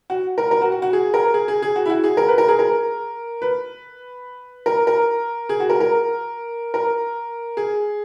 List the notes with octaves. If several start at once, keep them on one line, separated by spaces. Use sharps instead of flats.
F#4
A#4
A#4
F#4
F#4
F#4
G#4
A#4
G#4
G#4
G#4
F#4
E4
F#4
G#4
A#4
B4
A#4
G#4
A#4
B4
A#4
A#4
G#4
F#4
A#4
A#4
A#4
G#4